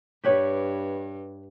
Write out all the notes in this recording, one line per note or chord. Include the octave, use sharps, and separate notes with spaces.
G2 G4 B4 C#5